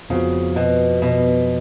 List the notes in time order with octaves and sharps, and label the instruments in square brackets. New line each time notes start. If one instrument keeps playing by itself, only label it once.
[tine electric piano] F2 F3 B3 F#4 [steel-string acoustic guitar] C#3
[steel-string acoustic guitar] B2
B2